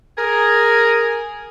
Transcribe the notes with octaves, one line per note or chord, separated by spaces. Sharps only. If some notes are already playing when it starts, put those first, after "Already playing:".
G#4 A#4